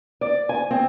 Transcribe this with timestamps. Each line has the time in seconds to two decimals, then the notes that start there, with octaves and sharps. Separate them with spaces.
0.21 D5
0.49 G#5
0.71 C4